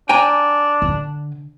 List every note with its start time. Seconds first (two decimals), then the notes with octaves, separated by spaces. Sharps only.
0.09 D4 G5 G#5 A#5
0.82 D3